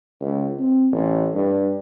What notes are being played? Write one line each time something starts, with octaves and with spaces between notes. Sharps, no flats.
C#2
C4
A1
G2